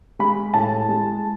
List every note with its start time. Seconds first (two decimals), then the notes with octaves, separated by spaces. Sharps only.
0.19 G#3 B5
0.54 A2 A5
0.89 G#3